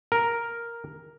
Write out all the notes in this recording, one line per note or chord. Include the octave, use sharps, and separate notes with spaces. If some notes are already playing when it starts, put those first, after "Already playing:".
A#4